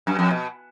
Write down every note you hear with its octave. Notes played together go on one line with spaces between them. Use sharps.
F#2
F2
B2